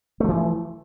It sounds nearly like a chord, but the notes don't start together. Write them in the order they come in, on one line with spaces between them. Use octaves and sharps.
A3 F3 E3